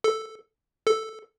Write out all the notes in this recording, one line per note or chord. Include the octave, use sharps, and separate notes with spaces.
A4
A4